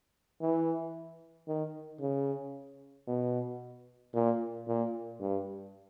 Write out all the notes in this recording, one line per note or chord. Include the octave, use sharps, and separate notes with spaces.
E3
D#3
C#3
B2
A#2
A#2
G2